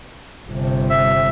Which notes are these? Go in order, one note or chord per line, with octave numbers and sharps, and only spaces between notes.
G1 C3
E5